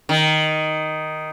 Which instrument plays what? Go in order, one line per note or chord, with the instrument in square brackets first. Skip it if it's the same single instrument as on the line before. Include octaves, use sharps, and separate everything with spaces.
[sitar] D#3